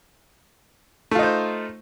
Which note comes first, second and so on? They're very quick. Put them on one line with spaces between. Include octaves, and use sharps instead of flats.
A3 F4 D#4 C5